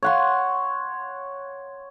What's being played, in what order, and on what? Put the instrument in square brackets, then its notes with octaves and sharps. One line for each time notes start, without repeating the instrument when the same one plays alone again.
[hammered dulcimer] C#5 F#5 C6